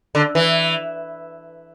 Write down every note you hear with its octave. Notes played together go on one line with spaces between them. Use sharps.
D3
E3